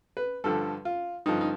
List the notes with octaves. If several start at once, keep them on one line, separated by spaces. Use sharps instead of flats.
B4
G2 D3 F3 A4
F4
G2 D3 F3 D#4
D#4